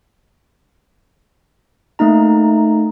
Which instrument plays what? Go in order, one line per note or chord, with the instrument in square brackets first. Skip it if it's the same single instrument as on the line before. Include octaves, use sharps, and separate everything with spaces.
[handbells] A3 A#3 D#4 A#5